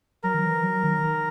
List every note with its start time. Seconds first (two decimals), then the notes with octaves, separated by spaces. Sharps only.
0.23 F#3 A#4
0.34 D#3
0.43 E3
0.63 F#3
0.83 D#3
1.03 D#3